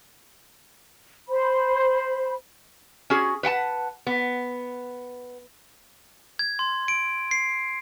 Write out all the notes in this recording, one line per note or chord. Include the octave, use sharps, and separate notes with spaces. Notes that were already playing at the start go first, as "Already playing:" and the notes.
C5 B5
C#4 F#4 G#4
B4 F#5 G5 A5
B3
G#6
C6
D7
C7